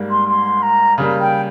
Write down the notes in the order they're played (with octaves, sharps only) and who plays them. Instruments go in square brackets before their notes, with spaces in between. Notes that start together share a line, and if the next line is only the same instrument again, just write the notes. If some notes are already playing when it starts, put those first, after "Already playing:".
Already playing: [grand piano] G#2 G3 A#3
[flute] C6
C6
A#5
[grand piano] C#3 G3 A#3
[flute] G5